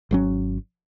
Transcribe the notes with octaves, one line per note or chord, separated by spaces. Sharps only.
G#1 F#3 C#4